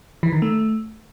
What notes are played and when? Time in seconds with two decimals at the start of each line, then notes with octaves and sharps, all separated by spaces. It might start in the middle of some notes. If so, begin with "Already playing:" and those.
0.23 E3
0.33 D#3
0.42 A3